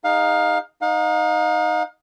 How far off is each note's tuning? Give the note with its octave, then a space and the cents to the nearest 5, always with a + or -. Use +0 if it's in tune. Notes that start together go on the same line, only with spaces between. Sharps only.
D#4 +0 G#4 -30 F5 +20
D#4 +0 F5 +40